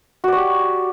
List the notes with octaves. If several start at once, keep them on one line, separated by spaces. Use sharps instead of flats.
F#4 G4 C#5 D5